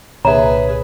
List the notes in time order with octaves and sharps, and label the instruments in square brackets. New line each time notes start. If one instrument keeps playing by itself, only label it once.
[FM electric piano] C2 A#2 D3 [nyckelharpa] G#4 B4 [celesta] C#5 E5 [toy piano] A#5